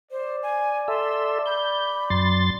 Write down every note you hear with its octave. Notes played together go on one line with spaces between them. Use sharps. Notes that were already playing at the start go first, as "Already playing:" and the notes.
C5 D5
G#5
A4 E5 C6
B5 G6
F#2 C6 A6